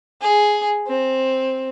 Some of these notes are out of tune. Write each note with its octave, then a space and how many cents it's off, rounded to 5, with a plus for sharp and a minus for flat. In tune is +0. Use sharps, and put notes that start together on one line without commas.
G#4 +5
C4 +10